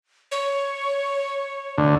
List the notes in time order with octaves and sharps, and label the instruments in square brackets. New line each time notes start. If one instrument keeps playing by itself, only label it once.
[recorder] C#5
[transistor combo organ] D2